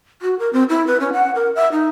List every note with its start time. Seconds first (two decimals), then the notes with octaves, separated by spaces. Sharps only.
0.22 F#4
0.39 A#4
0.53 C4
0.69 E4
0.87 B4
1.00 C#4
1.13 F#5
1.35 A#4
1.56 E5
1.72 D#4